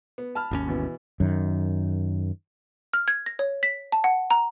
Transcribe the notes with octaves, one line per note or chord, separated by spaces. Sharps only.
B3
A5 B5 F6
G#1 D#2 C#4
B2 E3
F#2 D#3
F6
G#6
A#6
C#5
B6
A5
F#5
A#5